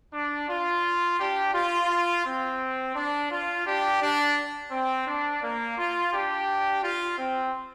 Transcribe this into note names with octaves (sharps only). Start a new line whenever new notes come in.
D4
F4
D4 G4
F4
C4
D4
F4
D4 G4
D4
C4
D4
A#3
F4
D4 G4
F4
C4